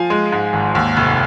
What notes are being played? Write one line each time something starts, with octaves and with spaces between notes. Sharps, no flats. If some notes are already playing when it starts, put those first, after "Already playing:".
Already playing: F3 F5 G#5
G#3
G#2
G#1
D#2
F1